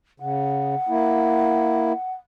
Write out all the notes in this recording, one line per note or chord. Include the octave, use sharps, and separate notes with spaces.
C#3 F#5
A#3 E4